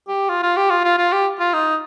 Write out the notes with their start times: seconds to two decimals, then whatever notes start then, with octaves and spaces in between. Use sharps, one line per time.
0.08 G4
0.29 F4
0.43 F4
0.57 G4
0.70 F4
0.85 F4
0.98 F4
1.12 G4
1.40 F4
1.54 D#4